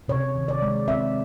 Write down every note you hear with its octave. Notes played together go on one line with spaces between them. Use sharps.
C3 C#5
D#3
D5
G#3
C4 E5